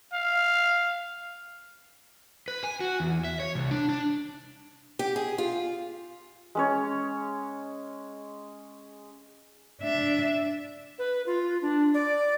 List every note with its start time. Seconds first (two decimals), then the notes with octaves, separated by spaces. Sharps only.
0.14 F5
2.48 B4
2.64 G#5
2.80 F#4
3.00 E2
3.25 E5
3.40 C#5
3.55 C2
3.71 D4
3.89 D4
4.99 G4
5.16 G#4
5.38 F4
6.55 G#3 C#4 C#5
9.81 D4 E5
10.99 B4
11.26 F4
11.62 D4
11.94 D5